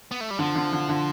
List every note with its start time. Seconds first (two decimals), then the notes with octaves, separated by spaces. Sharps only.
0.11 B3
0.21 A3
0.31 G3
0.39 D3 F3
0.55 D3
0.73 D3
0.89 D3